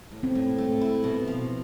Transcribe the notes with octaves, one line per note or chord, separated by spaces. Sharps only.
A2
C4
A2
A3
E4
B2
F3